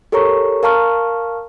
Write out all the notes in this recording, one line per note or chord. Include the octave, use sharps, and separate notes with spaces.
G4 A4 A#4 C#5 A#5 C#6
A#4 F5 A5 A#5 C#6 F6